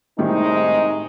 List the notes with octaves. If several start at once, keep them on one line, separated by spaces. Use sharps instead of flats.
A2 C3 D#3 G3 G#3 D#4